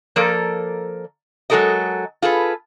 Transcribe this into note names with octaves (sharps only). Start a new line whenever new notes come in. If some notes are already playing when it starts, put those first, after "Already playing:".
F3 A#3 A4 A#4 D5
F#3 G#3 G4 A4 A#4 D#5
F4 G#4 A4 B4